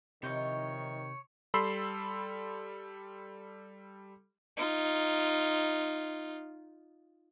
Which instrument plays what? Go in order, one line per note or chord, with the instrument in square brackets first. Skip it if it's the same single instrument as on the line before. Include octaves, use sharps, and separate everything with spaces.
[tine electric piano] C3 G6 [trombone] D#3 [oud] F3 D#4 E4 [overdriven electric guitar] C#5
[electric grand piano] G3 A4 B5 C6 E6 C7
[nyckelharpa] D#4 F4